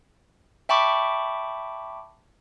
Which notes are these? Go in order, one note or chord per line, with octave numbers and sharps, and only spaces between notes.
E5 G5 A5 B5 C#6 D6